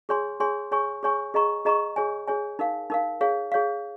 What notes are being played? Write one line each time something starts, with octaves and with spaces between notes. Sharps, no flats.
G#4 C#5 G#5 C6
G#4 C#5 G#5 C6
G#4 C#5 G#5 C#6
G#4 C#5 G#5 C#6
G#4 D#5 A#5 C#6
G#4 D#5 A#5 C#6
G#4 C#5 G#5
G#4 C#5 G#5
D#4 A#4 F5
D#4 A#4 F5
G#4 C#5 F5
G#4 C#5 F5